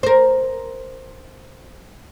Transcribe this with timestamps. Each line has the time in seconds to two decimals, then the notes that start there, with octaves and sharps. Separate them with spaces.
0.03 A#4 C5